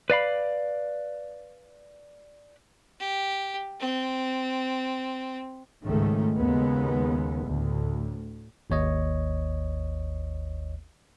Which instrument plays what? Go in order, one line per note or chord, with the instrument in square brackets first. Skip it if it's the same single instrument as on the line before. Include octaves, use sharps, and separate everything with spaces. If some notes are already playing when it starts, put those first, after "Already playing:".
[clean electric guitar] B4 D5 F5 B5
[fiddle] G4
C4
[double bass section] C#2 G#2 D#3 G#3 A3 C#4
D#2 C#3 G#3 B3
D2 A2
[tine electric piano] G#1 D#2 C#5 D#5